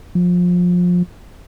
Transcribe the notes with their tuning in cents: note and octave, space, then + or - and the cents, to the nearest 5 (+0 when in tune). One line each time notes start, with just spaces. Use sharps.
F3 +25